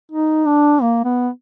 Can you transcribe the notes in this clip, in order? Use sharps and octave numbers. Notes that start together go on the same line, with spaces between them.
D#4
D4
A#3
B3